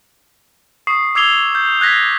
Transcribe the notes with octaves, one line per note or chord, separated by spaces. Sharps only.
C#6 D#6 C7
D6 E6 G#6 C7 F7 G7
G6
F#6 G#6 A#6 B6